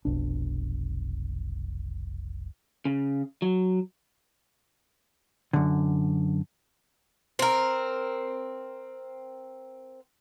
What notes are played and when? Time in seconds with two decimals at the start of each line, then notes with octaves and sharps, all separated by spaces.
0.05 F1 B1 D4
2.85 C#3
3.42 F#3
5.53 F#2 D3
7.39 C4 A#4